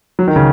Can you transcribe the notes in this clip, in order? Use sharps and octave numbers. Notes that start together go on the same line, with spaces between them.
F#3
D#3
C#3